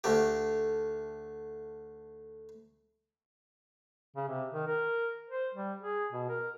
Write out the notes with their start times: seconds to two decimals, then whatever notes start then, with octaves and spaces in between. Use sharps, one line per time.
0.04 D2 A3 G4
4.16 C#3
4.28 C3
4.53 D#3
4.67 A#4
5.30 C5
5.54 G3
5.82 G#4
6.12 B2
6.29 A#4